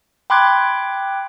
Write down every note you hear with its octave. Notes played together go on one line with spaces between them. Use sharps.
G5 B5 C6 D6 F#6 G#6